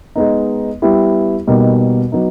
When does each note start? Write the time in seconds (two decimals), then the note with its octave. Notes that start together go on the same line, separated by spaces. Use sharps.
0.16 G#3 B3 D#4
0.82 G3 B3 E4 G4
1.47 B2 G3 A#3 D#4
2.12 F#3 B3 D#4